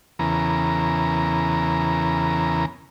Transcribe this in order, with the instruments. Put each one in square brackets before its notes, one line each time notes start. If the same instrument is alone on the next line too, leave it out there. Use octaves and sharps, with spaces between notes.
[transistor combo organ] E2 C#3 E3 B3 A#4 A#5